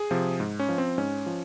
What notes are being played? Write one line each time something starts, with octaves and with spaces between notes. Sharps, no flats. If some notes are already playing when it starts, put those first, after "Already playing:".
Already playing: G#4
C3 F3
G#2
C#4
F3
C4
G#2 C#4
F3